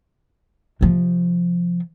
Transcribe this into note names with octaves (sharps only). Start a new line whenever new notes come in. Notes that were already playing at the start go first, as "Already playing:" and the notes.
C3 F3